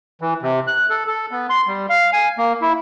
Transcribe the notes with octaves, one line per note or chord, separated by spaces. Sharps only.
E3
C3
F#6
A4
A4
B3
C6
G3
F5
G#5
A#3
E4